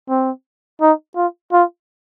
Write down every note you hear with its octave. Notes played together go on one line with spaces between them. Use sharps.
C4
D#4
F4
F4